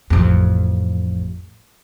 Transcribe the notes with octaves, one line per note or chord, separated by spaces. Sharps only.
A1 F2